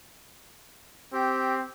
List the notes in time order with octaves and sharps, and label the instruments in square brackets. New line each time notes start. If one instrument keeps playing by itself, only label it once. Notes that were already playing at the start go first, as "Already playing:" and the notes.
[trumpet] C4 [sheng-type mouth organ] G4